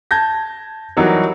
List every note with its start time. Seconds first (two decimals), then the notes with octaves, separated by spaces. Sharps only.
0.11 A5 G6 G#6 A#6
0.97 E3 F#3 G3 D#4 F#4 A#4